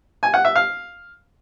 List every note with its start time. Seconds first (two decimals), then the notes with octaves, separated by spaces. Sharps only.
0.23 G#5
0.34 F#5
0.45 E5
0.55 F5